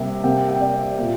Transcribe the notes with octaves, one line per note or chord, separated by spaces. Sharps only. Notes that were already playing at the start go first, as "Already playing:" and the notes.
Already playing: C3 G3 A#3
C3 A#3 G5
G5
D5
A#2 A#3